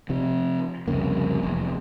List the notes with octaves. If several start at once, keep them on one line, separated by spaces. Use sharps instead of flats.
C3 F3
C2 F2 C#3 A#3
F1 E2